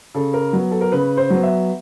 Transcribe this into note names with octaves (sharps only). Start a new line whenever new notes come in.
C#3 A4
A#4
F#3 B3
A4
A#4
C#3 B4
C5
F#3 B3
E5